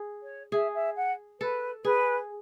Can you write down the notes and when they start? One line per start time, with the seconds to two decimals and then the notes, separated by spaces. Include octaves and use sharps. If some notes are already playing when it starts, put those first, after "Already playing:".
Already playing: G#4
0.22 C#5
0.52 G#4 E5
0.74 E5
0.96 F#5
1.40 A4 B4
1.84 G#4 B4